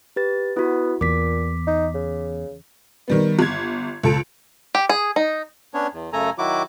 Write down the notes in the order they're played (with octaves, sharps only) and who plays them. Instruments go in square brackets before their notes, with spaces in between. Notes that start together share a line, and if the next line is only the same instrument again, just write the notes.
[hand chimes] G4 B4 A6
[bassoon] B3 [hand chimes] E4 F#4
[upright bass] E2 [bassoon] A#2 [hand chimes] D6 B6
[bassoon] D#4
C#3
[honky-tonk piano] D#3 G3 B3
G1 G#6
C#2 A4 D7
[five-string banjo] G4
G#4
D#4
[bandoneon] B3 C#4 D4 C#5
E2
F#2 C#3 A3 A4 G#5 A#5
D#3 F#3 E4 F#4 D6